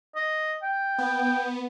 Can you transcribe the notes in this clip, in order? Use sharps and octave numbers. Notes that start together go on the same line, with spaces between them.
D#5
G5
B3